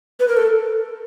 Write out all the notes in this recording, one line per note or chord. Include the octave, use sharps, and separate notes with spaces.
B4
A#4
A4